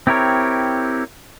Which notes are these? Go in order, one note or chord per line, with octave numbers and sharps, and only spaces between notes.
C4 E4 G4 A#4 C#5